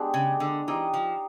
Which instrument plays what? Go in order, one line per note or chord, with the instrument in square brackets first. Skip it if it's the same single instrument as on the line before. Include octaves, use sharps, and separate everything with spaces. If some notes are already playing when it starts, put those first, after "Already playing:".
Already playing: [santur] G#3 B3 D4 G4
[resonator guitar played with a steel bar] C#3
D3
[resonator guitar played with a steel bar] E3 [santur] D#4 G4 C5 D#5
[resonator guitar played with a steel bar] F3